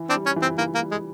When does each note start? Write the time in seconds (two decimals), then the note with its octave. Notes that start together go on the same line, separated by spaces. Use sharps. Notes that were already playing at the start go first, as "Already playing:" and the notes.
Already playing: E3
0.09 C4 D4
0.16 G3
0.26 C#4
0.36 E3
0.42 C4
0.58 E3 A#3
0.75 A#3
0.80 G3
0.91 G#3